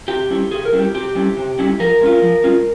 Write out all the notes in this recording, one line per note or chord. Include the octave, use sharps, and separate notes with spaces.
C3 G4
G3 C#4 E4
C3 G#4
A#4
G3 C#4 E4
G4
C3 G4
G3 C#4 E4
C3
G3 C#4 E4
F3 A#4
G#3 C#4 F4
F3
G#3 C#4 F4